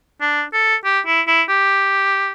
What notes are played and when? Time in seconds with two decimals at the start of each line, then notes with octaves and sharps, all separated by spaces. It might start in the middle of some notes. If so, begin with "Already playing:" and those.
0.21 D4
0.53 A4
0.85 G4
1.06 E4
1.27 E4
1.49 G4